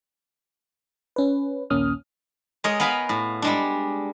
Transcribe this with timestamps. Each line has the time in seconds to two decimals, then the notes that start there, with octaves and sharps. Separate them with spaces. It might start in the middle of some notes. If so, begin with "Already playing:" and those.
1.16 C#4 B4
1.70 A#1 D#2 A#3 C#4 D#6 F6
2.64 G#3 A#4 C#5 D#5
2.80 B3 A#4 F5 G#5 A#5 B5
3.09 A2
3.42 G3 G#3 D4